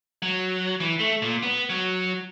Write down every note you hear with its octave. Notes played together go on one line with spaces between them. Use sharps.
F#3
E3
A3
A#2
B3
F#3